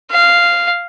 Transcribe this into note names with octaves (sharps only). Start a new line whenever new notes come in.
F5